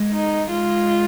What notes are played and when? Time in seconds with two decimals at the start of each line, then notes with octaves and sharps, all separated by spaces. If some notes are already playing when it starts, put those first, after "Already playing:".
Already playing: G#3
0.12 D#4
0.51 G#3 F4